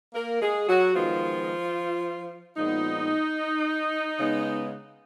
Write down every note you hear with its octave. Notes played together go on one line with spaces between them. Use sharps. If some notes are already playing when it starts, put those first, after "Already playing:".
A#3 A#4
G#3 G#4
F#3 F#4
D#3 F3 G#3 B3 F4
A#2 F3 G#3 B3 D#4
C#3 G#3 B3